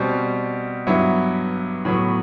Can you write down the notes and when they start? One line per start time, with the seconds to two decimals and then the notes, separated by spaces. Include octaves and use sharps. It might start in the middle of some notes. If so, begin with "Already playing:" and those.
Already playing: B2 G3 C4
0.87 G2 F#3 B3 E4
1.85 A2 F#3 B3